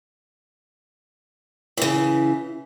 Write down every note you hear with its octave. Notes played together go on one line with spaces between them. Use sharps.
C#3 E3